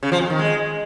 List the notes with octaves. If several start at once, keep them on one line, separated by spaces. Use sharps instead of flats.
C#3
F3
F2
D#3
G#3